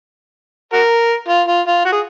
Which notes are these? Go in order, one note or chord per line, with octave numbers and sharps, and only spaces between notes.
F#4 A#4
F4
F4
F4
F#4
G#4